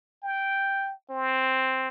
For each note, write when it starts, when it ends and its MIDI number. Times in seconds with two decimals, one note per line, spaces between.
0.23 0.93 79
1.10 1.88 60